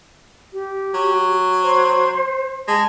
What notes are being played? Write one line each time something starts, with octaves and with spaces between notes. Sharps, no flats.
G4
F#3
C5
G#3 A5